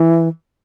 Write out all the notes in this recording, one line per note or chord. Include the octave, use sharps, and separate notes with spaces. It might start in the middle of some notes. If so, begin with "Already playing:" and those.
Already playing: E3